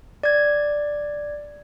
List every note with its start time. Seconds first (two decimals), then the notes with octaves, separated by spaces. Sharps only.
0.23 D5 G#6